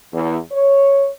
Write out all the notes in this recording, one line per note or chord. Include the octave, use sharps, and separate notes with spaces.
E2
C#5